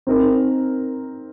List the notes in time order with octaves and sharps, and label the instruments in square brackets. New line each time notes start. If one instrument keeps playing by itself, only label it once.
[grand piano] C4 D#4 A#4